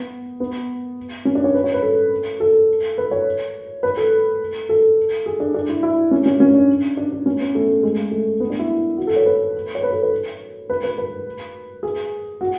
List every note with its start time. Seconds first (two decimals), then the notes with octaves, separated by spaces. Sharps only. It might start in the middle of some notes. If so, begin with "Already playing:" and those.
Already playing: B3
0.40 B3
1.25 C#4
1.35 D4
1.44 C#5
1.54 B4
1.64 C#5
1.74 B4
1.82 A4
2.40 A4
2.98 B4
3.11 C#5
3.83 B4
3.97 A4
4.69 A4
5.26 G#4
5.40 D4
5.54 D4
5.69 E4
5.83 E4
6.11 C#4
6.26 C#4
6.40 C#4
6.54 D4
6.97 D4
7.12 D4
7.26 C#4
7.40 B3
7.55 A3
7.83 G#3
8.11 A3
8.40 B3
8.50 D4
8.59 E4
8.98 F#4
9.07 A4
9.16 C#5
9.26 B4
9.75 C#5
9.83 B4
9.93 A4
10.02 B4
10.70 B4
10.84 B4
10.98 B4
11.83 G#4
12.41 F#4